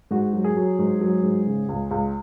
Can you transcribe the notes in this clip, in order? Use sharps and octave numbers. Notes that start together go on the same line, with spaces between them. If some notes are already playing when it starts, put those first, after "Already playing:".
G#2 F#4
F#3
G#4
F#3
G#2
F#3
G#2
C#3
C#2
C#2